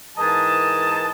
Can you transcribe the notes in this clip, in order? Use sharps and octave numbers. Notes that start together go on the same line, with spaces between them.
G#2 E3 A#4 D#5 A5